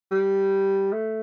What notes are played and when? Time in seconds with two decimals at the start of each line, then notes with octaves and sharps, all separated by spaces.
0.12 G3
0.93 A3